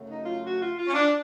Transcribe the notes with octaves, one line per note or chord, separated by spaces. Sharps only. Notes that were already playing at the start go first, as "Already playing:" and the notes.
Already playing: F#2 C#3 F#3 A3
D#4
F4
F#4
F4
F4
C#4
D4